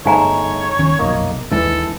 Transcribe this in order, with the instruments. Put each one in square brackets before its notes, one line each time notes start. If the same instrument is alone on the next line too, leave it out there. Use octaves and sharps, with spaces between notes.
[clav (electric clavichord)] G1 G#3 A3 [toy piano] D#4 G#5 A#5 [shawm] C#5
[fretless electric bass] D#1 D#3 C#4
[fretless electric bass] F1 B1 F#2 [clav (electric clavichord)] A#3 D#5
[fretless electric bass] D#2 G#3 D4 [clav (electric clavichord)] E3 [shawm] A4